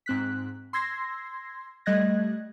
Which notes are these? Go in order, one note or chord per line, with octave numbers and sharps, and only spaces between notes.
G#2 C4 F#6 B6
C6 E6 G#6 A#6 C7
G3 A3 D#5 F#6 G#6 A#6